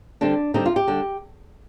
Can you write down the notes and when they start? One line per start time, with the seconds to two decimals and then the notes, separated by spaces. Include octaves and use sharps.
0.21 D3 G3 C4 D4
0.54 D3 G3 C4 D#4
0.66 F4
0.76 G4
0.88 D3 G3